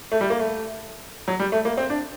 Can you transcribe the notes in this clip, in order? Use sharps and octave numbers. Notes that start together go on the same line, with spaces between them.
A3
G3
A#3
A3
F#3
G3
A3
A#3
C4
D4